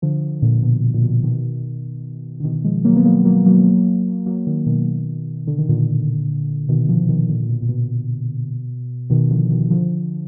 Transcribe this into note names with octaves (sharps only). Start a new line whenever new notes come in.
D3 F3
A#2 D3
B2
A#2
B2
B2 D#3
D3
B2 D#3
F3 G#3
F#3 A#3
B3
F#3 A#3
F#3 A#3
F#3 A#3
F#3 A#3
D#3 F#3
B2 D#3
D3
D#3
A#2 D3
B2 D#3
D3 F3
B2 D#3
A#2 D3
A#2
B2
A#2
B2
B2 D#3
D3 F3
B2 D#3
D3 F3